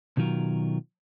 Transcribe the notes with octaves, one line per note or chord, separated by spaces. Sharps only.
B2 D#3 F#3 F4 A#4